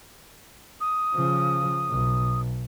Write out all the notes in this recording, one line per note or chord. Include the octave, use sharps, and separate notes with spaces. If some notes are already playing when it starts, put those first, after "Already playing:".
D#6
C#3 F3
B1